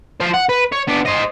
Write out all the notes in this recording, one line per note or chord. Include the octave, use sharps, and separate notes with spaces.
F3 C5
F#5
B4
C#5
B3 D4
C5 D#5